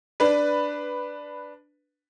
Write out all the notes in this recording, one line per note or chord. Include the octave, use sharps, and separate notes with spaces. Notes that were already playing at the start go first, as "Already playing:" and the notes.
D4 B4